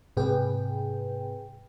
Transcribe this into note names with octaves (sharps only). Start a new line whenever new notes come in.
G#2 C3 G#4 B4 G5